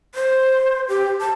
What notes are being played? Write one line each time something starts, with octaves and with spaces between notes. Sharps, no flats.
C5
G4
A5